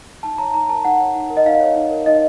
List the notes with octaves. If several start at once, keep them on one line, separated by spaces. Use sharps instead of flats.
D#4 A5
C#5 A#5
D#4 A#5
A#4 A5
D#4 F#5
C#5
D#4
A#4
D#5
D#4 F5
C#5
D#4
A#4
D#4 D#5